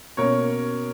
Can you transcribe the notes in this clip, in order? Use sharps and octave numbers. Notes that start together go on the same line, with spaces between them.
B2 A#3 C#4 A#4 C#5